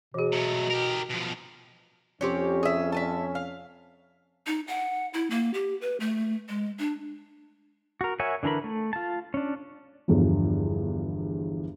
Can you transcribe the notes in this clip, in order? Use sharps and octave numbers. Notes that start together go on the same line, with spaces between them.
B2 E3 G#4
F#3 A3
G4 A#4
B2 F3
F2 C4 C#4 G4 C#5
G#4 E5
E5 G#5 A5
F5
D#4
F#5
E4
A#3
G4
B4
A3
G#3
D4
F#4 A#4
A#4 C#5 E5 F#5 G#5
D3 E3 D4 A#4 B5
A3
F4 A5
C#4 D4
G1 E2 G2 F3